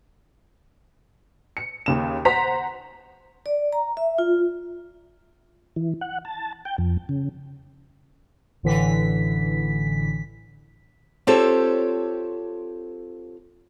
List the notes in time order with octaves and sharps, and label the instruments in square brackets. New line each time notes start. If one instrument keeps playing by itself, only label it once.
[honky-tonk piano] C#7
D#2 C#3 E7
C5 F#5 A#5 B6
[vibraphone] D5
A#5
E5
F4
[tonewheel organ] E3
F#5
A5
G5
F2
C#3
[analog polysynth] A1 A2 D3 E3 B6
[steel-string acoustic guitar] C4 F4 G4 A4 C5 C#5